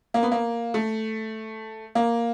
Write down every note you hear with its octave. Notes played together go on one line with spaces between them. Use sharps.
A#3
B3
A#3
A3
A#3